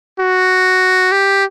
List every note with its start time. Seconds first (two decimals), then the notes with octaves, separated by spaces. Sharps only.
0.19 F#4
1.12 G4